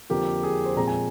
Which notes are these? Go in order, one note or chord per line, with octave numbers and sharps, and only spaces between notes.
F2 D3 F3 A#3 G4
G#4
C5
A#2 F3 G#3 C4 A#5
G#5